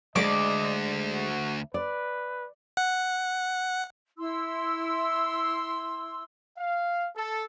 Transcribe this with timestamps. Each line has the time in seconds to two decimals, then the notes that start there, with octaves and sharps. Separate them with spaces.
0.16 D2 G#3 D5 D#5 D6
1.11 F#4
1.74 B4 D5
2.77 F#5
4.18 E4 C6 E6
6.58 F5
7.16 A4